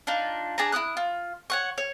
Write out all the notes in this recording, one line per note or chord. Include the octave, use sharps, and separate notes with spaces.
D4 D#4 F4
D4 G#4 A5 A#5
E4 F#4 D#6 F#6
F4
C#5 F#5 C#6
C#5